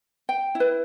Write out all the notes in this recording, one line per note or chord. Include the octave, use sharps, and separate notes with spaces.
G5
E4
B4